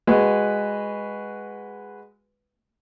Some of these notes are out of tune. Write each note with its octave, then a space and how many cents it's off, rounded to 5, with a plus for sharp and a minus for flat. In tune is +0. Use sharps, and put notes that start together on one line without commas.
G#3 -10 F#4 +0 B4 +0